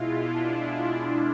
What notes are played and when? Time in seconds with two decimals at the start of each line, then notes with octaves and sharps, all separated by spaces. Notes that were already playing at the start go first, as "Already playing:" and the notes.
Already playing: B2 G#3 E4 F4
0.23 D4